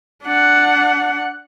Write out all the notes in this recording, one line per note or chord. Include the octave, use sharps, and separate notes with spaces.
D4 F#5